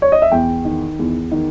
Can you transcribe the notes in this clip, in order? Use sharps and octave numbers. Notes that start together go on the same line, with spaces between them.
C#5
D#5
E5
E2 G5
D#3
E2
D#3